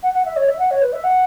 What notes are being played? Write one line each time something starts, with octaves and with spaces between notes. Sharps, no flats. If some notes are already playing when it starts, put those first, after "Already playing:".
F#5
F#5
E5
C#5
E5
F#5
C#5
B4
E5
F#5